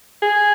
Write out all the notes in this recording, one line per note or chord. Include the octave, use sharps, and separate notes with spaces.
G#4